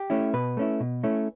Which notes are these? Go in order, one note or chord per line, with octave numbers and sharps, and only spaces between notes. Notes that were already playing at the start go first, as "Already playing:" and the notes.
Already playing: G4
A3 C#4 E4
B2 B4
A3 C#4 E4
B2
A3 C#4 E4